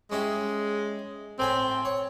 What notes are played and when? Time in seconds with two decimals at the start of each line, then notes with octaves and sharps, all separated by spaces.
0.11 G#3 C#4 E4 G4
1.39 A2 C4 G#5 B5
1.85 C#5